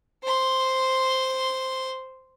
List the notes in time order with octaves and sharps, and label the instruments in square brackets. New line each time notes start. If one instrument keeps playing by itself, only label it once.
[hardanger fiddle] C5 C6